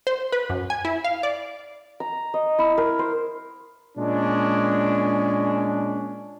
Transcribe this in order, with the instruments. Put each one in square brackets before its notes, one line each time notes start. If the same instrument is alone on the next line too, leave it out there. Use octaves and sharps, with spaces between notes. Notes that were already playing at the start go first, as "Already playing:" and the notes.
[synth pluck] C5
B4
F#2
G#5
E4
F5
D5
[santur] A#5
D#5
E4
A#4
C5
[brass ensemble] A#2 G#3 C#4 D4